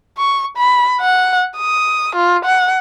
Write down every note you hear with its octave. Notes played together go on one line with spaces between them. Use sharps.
C#6
B5
F#5
D#6
F4
F#5